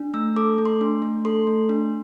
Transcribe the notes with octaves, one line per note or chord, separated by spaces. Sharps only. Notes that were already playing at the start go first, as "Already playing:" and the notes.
Already playing: D4
A3 E6
A4 D6
A3
C6
D4
A3
A4 C6
A3
D4